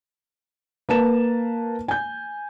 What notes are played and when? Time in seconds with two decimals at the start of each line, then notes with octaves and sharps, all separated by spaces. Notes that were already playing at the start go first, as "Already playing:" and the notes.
0.89 A#3 B4 A5 E7
1.88 G#5 G6